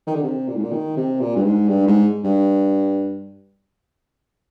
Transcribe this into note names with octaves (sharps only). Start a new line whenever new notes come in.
D#3
D3
C3
A#2
G#2
A#2
D#3
C3
A#2
G2
G#2
G2
G#2
G2